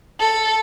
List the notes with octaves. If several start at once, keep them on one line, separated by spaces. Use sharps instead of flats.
A4